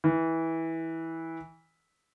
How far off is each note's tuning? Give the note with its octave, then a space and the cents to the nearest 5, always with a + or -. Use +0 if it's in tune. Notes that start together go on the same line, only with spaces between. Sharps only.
E3 -15